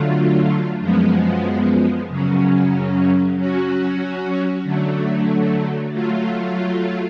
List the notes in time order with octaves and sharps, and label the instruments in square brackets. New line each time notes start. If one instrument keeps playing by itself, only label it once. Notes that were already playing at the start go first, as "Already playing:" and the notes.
Already playing: [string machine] D3 F#3 A3 F4
F#2 F3 G#3 B3
F#2 C#3 F#3 C#4
F#3 C#4 F#4
D3 F#3 A3
F#3 A3 F4